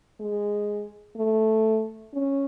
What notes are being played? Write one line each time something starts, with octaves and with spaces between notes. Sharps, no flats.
G#3
A3
C#4